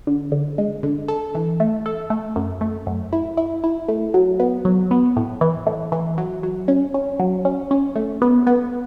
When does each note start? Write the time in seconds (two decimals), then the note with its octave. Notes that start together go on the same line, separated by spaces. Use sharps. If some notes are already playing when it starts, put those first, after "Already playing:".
0.07 D3
0.32 D3
0.58 G#3
0.83 D3
1.08 A4
1.35 E3
1.60 A3
1.86 A4
2.10 A3
2.36 F#2
2.61 A3
2.87 F#2
3.13 E4
3.37 E4
3.64 E4
3.88 A3
4.14 F#3
4.40 B3
4.65 F#3
4.91 B3
5.16 A2
5.41 E3
5.67 A2
5.92 E3
6.18 F#3
6.43 F#3
6.68 C#4
6.94 C#4
7.20 F#3
7.45 C#4
7.71 C#4
7.96 A3
8.22 B3
8.47 B3